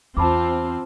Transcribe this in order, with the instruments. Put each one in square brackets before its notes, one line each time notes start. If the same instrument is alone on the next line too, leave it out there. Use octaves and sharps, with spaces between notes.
[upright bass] E2 [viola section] C4 F4 [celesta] A5 B5 D6